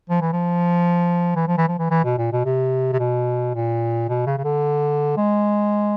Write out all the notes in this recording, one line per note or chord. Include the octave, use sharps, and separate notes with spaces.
F3
E3
F3
E3
F3
E3
F3
E3
E3
B2
A#2
B2
C3
C3
B2
A#2
B2
C#3
C#3
D3
G#3